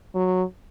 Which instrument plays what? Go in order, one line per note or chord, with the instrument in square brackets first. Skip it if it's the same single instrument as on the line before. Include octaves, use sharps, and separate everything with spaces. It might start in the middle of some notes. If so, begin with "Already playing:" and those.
[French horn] F#3